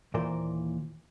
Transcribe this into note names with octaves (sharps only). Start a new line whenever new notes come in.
D#2 A#2 E3 A#4 C5 D5